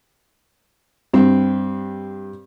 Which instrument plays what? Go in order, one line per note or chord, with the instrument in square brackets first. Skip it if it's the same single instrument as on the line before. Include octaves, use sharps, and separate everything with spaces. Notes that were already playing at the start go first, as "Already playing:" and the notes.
[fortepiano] G2 C4